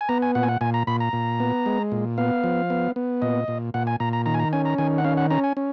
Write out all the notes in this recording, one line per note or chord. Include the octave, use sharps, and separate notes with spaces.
G#5
B3 A#5
G#5
A#2 F#5
G#5
F#5
A#2 G#5
A#5
A#2 B5
A#5
A#2
B3
G#3
A#2
B3 F5
F3
B3
B3
A#2 D#5
A#2
A#2 F#5
G#5
A#2 A#5
A#5
D#3 A#5
G#5
A#5
C#4 G#5
A#5
D#3 G#5
F#5
C#4 F5
F#5
C#4 A#5
G#5
C#4